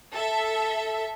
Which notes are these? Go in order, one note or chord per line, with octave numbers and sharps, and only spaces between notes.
A4 E5